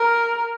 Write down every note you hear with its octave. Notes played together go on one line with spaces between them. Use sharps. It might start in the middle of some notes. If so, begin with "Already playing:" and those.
Already playing: A#4